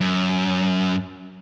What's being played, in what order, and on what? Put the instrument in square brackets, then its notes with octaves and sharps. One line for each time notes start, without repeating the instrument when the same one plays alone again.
[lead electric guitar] F#2